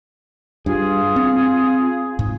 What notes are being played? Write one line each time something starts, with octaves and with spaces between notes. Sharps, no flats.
G2 F4 G#4
C4
G#2